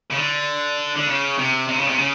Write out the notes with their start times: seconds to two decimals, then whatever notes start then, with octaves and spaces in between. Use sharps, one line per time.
0.10 C#3
0.16 D3
0.96 D3
1.07 C#3
1.38 C3
1.68 C3
1.78 C#3
1.88 C3
1.99 C#3